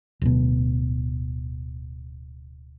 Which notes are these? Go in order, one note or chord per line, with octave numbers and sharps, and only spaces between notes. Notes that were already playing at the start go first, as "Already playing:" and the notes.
D1 B2